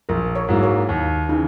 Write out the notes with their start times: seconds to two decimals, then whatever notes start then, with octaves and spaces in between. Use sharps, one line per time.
0.09 A#1 A#4
0.35 A#4 C#5
0.49 G#2 F#3 A#3 E4
0.63 A#4 C#5
0.89 D#2
1.29 C#3 E3 D#4